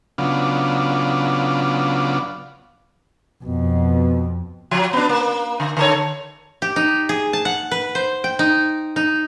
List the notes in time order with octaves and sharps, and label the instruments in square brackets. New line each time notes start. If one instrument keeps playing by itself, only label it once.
[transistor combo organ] C#3 F#3 B3 D4 F4
[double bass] F2 [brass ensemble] B2
[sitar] F3 F#3
B3 D4
A#3
D3
D3 A4 C#5
[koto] G4
D#4
G#4
A5
F#5
B4
C5
G5
D#4
D#4